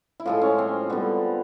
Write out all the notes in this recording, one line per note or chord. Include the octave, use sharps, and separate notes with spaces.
E4
A2 F3 G#3 F4
C#4
C4
D3 G3 B3